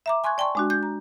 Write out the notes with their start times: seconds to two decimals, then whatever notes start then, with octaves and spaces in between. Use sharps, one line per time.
0.06 E5 A#5 D6
0.24 G#5 C6 C#6 F#6 G#6
0.38 D5 G5 A5 C6 C#6
0.55 G#3 D4 F#4
0.70 G6
0.83 A#5